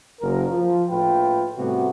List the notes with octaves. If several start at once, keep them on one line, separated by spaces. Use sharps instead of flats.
F#1 A#4
F3
A#1 A2 F4 B4 G5
A2 C3 G3 A3 B3 F#4